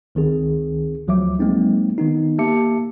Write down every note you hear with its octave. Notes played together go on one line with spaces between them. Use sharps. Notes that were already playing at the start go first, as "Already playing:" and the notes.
C#2 D#3 C4 G#4
D2 F3 F#3 E5 D6
F#3 G#3 A#3 C4 D#4
D#3 B3 D#4
A#3 G4 E5 A5 D6 C#7